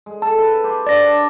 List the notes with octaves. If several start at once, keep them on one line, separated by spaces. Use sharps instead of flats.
G#3
A4 A5
E4 B4
G4 C6
D4 C#5 D5 A#6